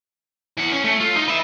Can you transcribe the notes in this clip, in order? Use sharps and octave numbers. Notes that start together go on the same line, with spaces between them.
E3 F#5
C#4
A3
F4
D#4
B4 E5